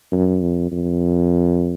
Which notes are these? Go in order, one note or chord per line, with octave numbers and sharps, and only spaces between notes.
F#2
F2
F2